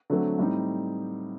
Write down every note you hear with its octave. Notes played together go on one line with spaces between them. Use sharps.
D3 F#3 A3 C4
A2 G3 C4 D#4